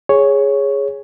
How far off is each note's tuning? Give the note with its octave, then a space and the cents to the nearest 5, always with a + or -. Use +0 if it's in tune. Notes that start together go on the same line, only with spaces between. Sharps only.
G#4 -5 C#5 +0